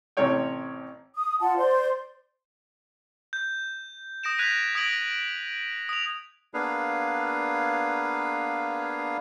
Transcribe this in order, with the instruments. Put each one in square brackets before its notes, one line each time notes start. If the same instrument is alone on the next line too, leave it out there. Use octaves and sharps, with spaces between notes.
[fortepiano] A1 C3 C#4 A4 C#5 G5
[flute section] D#6
F4 F#5 A5
C5 D5 C6
[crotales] G6
D#6 A#6 D7 E7
F#6 G#6 A#6 B6 D#7 F7
D#6 G#6 A#6 D7 F#7
D#6 F7
[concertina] A#3 B3 D4 G#4 B4 F5